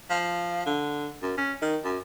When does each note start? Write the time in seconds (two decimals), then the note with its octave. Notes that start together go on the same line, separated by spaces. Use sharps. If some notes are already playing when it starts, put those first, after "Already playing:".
0.10 F3
0.66 D3
1.22 F#2
1.38 C#4
1.62 D#3
1.85 F#2